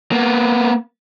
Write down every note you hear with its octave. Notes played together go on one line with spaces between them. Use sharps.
A#3 B3